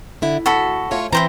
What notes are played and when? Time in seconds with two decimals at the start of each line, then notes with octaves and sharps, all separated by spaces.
0.22 D3 E4
0.46 D2 F#4 A4 B5
0.91 A3 F4 C#5
1.13 E3 C4 E4 C5 A#5